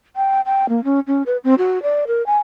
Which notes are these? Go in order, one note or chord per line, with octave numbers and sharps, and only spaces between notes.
G5
G5
A#3
C#4
C#4
B4
C4
F#4
D5
A#4
G#5